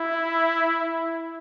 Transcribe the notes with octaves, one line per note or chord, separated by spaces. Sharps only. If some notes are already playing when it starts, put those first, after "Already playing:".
Already playing: E4